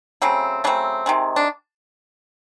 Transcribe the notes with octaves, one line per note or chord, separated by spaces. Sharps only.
C#3 F#3 A3 C4
C#3 F#3 A3 C4 D4
C3 D#3 G#3
D4